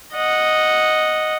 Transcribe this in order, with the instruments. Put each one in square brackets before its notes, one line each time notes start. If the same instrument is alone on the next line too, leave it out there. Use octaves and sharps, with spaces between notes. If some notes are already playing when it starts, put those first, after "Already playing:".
[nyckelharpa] D#5 F#5